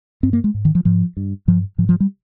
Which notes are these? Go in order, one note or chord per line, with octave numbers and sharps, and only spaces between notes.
G2 C4
A#3
G#3
G#2
D#3
F3
G#2 F3
G2
G2 F3
G#2 F3
F3
G3